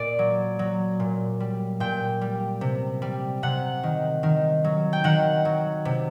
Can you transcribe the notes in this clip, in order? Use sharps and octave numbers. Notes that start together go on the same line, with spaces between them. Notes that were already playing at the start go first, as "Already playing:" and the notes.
Already playing: A#2 D5
F#3
F#3
A#2
G3
A#2 G5
G3
C3
G3
C3 F#5
D#3
D#3
F#3
G5
D#3 F#5
F#3
C3